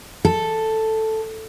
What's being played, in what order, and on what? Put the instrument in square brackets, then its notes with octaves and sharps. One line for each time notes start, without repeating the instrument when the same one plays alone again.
[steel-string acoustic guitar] A4